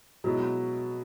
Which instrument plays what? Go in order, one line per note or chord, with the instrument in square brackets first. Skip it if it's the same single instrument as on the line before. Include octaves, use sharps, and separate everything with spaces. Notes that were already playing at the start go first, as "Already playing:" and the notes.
[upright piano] B2 G#3 B3 E4 [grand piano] F#3